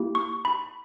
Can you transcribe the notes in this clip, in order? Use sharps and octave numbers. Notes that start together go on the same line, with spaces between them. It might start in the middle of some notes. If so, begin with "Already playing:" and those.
Already playing: A#3 E4 G4
C#6
B5